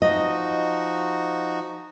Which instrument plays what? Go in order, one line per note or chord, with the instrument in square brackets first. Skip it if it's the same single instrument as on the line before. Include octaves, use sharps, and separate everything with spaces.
[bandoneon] F3 D#4 F#4 [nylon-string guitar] D#5